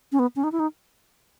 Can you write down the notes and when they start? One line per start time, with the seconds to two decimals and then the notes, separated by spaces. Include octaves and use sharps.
0.12 C#4
0.19 B3
0.36 C#4
0.44 D#4
0.52 E4
0.60 D#4